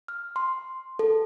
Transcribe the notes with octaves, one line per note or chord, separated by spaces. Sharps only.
F6
C6
A4